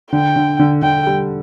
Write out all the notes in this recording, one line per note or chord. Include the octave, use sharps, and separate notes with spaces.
D3 G5
D3
D3
D3 G5
G3